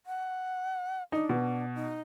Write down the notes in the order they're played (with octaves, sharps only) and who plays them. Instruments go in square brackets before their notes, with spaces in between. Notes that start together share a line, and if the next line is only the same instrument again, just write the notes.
[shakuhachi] F#5
[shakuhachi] D4 [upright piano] D#4
[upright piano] B2
[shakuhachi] D#4